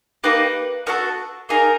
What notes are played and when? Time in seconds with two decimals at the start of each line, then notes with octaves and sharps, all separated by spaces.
0.24 A#3 D#4 G4 B4
0.86 B3 D4 F#4 A4 A#4
1.49 A#3 D#4 G#4 A#4